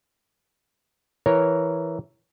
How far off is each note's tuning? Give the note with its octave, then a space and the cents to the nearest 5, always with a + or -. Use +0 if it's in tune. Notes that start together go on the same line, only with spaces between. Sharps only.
E3 +0 A#4 +0 C#5 +0